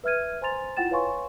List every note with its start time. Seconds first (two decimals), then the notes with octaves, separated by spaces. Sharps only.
0.04 B4 E5 F6 G#6 D#7
0.42 C5 G#5 A#5 C6 A6 F7
0.77 E4 F4 F#5 G5 A6 E7
0.91 B4 C#5 F5 G#5 C6 C#6